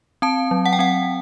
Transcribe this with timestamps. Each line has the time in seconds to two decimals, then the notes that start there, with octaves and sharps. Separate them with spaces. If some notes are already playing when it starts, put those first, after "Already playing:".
0.22 C4 A5
0.51 F#3
0.66 F#5
0.73 G5
0.79 C4 F#5